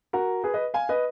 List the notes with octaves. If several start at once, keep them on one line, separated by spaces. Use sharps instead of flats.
F#4 A#4
G#4 B4
B4 D#5
F5 G#5
B4 D#5